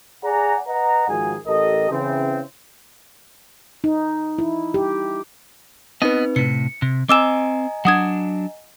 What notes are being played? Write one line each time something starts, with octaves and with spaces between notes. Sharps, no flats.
G#4 D5 F#5 G#5 A#5
B4 D#5 F#5 A#5
G#2 D#3 F3 F#4 G#4 G#5
A1 G4 A4 A#4 D#5
C#3 E3 C4
D#4
E4
G4
B3 C4 D#4 B4 D#5
A2 C3 C#7
C3
C4 D#5 G#5 A#5 D6 E6 E7
F#3 D4 F#5 D#6 G#6